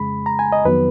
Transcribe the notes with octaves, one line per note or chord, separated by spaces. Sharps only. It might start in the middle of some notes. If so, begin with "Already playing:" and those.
Already playing: F2 C#3 G#3 B5
A#5
G#5
D#5
F2 D#3 F#3 B3 B4